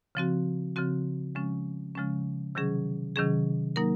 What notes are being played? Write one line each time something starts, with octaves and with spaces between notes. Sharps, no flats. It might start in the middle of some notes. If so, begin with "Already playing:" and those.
C#3 F3 C4 F#4
C#3 F3 C4 F#4
C#3 F3 G#3 C#4
C#3 F3 G#3 C#4
C3 D#3 F#3 C#4 G#4
C3 D#3 F#3 C#4 G#4
F#3 A#3 D#4 A#4